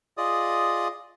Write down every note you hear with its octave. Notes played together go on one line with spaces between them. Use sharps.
F4 G#4 D5 D#5 D#6